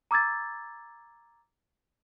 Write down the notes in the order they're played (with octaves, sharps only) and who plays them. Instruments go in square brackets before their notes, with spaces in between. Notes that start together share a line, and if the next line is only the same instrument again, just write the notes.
[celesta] A#5 D6 E6 G#6 A6